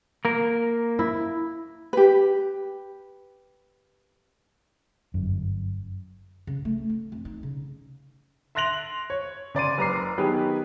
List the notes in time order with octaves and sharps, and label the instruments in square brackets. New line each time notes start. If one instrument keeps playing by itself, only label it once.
[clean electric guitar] A#3 A#4
[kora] E4
[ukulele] G4 B4
[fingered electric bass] G1 F#2
[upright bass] C#3
A3
D4
F2
D#4
C#3
[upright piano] E5 C6 F#6 A#6 F7 F#7
C#5
C#3 D5 C6 D#7
F#1 B4 A#5 D6 C7
D#3 F#3 B3 G4 G#4 B4